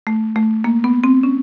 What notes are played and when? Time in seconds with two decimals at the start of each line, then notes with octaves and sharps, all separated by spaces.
0.07 A3
0.36 A3
0.64 A#3
0.84 B3
1.04 C4
1.23 C#4